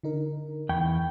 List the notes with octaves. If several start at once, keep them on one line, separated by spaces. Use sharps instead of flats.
D3 D#4 A#4
E2 G5 B5 C#6 G#6